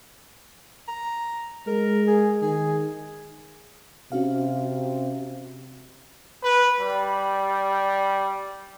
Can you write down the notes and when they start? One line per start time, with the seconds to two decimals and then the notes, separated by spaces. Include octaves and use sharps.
0.88 A#5
1.67 G#3 A#4
2.07 G#4
2.42 D#3 G#4
4.12 C3 C#4 F#4 F5
6.43 B4
6.80 G3